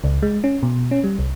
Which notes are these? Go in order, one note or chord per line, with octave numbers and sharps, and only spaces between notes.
C#2
G#3
C#4
B2
C#4
G3
C2